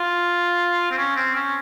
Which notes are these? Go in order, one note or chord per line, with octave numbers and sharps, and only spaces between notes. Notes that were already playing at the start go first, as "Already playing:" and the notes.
Already playing: F4
C4
C#4
C4
C#4